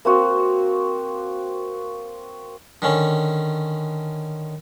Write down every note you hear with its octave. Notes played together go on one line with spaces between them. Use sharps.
A#3 C4 F#4
D3 D#3 C#4